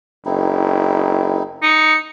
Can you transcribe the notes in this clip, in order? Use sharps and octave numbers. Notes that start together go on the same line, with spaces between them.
F#1 C4 D#4 E4
D#4 C#7